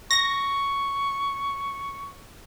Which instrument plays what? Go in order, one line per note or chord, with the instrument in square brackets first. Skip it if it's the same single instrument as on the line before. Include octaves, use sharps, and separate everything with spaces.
[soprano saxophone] C#6 [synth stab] A#6